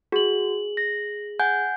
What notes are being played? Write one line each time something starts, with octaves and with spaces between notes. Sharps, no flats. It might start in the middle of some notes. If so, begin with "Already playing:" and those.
F#4 G#4 F#7
A#6
F#5 G#5 G6